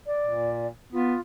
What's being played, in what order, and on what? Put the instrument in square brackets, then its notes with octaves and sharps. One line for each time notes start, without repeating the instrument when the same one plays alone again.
[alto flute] D5
[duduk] A#2
[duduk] B3 [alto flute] F4